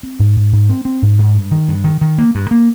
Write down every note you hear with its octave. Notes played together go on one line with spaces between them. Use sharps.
C4
G#2
G#2
G#2
C4
C4
G#2
G#2
G2
D#3
G2
D#3
D#3
A#3
G2
A#3